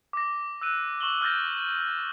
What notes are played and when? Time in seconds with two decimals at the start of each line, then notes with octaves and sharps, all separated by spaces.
0.13 D6 A#6
0.61 E6 F#6 D#7
1.01 C#6 E7 F#7 G7
1.21 D6 F6 G6 A6 A#6